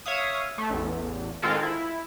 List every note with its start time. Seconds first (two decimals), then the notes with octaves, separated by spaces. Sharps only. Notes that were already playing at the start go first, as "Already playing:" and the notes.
0.06 C#5 E5 F5 D#6
0.58 A3
0.70 A1 E2
1.42 D#3 G#3 C4 F4 A4 A#4
1.63 E4